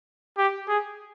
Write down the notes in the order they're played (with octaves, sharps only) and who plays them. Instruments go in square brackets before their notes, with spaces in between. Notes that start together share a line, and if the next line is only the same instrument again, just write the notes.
[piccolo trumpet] G4
G#4